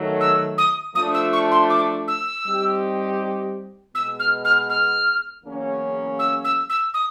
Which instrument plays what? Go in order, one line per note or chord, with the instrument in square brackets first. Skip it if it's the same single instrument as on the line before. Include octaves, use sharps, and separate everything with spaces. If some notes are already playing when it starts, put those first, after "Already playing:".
Already playing: [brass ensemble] D#3 F#3 A3
[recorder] E6
D#6
[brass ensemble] F3 A3 D4 [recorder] D#6
[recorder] E6
C#6
C6
D6
E6
[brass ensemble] G3 C4 D#4 G4
[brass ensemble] B2 G#3 B3 [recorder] E6
[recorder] F6
F6
F6
[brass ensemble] E2 C#3 F#3 A#3 C#4
[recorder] E6
E6
E6
D#6